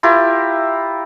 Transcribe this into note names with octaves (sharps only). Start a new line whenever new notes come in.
E4 F4 G4 A#4